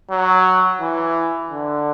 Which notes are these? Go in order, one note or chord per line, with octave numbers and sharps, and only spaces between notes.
F#3
E3
D3